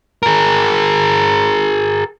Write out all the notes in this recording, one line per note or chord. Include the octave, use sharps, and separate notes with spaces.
G#4 A#4